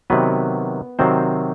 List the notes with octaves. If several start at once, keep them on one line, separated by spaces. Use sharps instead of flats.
C3 D#3 F#3 B3 B4
C3 D#3 F#3 C4 C5